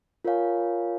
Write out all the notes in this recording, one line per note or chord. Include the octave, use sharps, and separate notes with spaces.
F4 A#4 C#5 F5 G#5